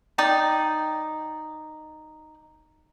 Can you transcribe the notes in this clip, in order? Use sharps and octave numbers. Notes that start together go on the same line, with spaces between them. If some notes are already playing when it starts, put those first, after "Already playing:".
D#4 D5 G5